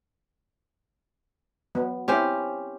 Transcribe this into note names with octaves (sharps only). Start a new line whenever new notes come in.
F#3 B3
C4 C#4 E4 G4 C5